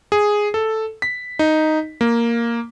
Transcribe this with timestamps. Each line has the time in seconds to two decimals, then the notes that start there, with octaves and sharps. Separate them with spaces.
0.12 G#4
0.54 A4
1.02 B6
1.39 D#4
2.01 A#3